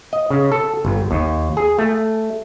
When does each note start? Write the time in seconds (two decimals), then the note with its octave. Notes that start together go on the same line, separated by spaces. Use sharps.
0.13 D#5
0.30 C#3
0.52 A4
0.85 G1
1.11 D#2
1.57 G#4
1.79 A3